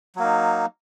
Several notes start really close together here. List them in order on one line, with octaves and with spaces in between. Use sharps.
F#3 A#3 D#4